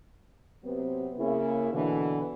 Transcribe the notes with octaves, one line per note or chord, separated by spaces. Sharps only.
C3 F#3 B3 C4
C#3 A#3 E4
B2 D3 E3